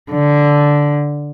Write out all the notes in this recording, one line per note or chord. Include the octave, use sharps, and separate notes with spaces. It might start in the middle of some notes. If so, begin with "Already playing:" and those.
D3